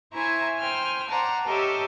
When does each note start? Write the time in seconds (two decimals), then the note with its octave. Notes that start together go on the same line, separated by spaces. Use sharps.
0.13 E4 C5 E5 G#5 A#5 C#6
0.60 C5 G5 G#5 F6
1.11 C5 D5 F#5 A5 A#5
1.48 G4 A4 A#4 C#5 D#5 E5